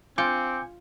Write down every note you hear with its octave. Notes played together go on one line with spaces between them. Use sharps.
C4 F4 G#5 D6 G6 C#7